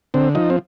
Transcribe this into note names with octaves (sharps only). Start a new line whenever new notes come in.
D3 C4
F3 D#4
C4